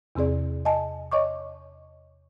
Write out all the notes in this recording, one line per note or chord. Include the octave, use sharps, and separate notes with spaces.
E2 C3 C4 G#4 D5
D#5 G#5 A5
C#5 D#5 C#6 D6